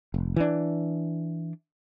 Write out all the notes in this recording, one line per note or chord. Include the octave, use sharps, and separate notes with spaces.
F1
E3 D4